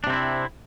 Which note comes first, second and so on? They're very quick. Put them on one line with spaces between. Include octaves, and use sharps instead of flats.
D4 C3 C4 E4